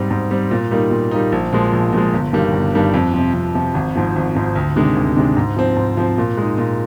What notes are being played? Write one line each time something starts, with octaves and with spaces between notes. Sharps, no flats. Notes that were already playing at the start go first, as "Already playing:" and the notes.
Already playing: G#2 G3 C4
G#2
G3 C4
A#2
G3 A#3 D#4
A#2
G3 A#3 D#4
A#1
A#2 F3 G#3
A#1
A#2 F3 G#3
G1
G2 D#3 G3 A#3
G1
G2 D#3 G3 A#3
F2
C3 F3
F2
C3 F3
G#1
G#2 F3
G#1
G#2 F3
D2
C3 D#3 G#3 D4
D2
C3 D#3 G#3 D4
G#2
F3 C4
G#2
F3 C4
A#2
G#3 D#4
A#2